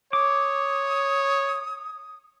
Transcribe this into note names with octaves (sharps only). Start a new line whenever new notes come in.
C#5 D6 D#6